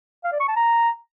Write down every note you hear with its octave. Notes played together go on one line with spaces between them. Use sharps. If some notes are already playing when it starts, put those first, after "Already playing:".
F5
D5
C#6
A5
A#5